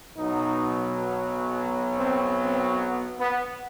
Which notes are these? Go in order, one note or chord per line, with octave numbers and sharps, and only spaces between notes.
B1 B2 F#3 D#4
C4
C4
B3
B3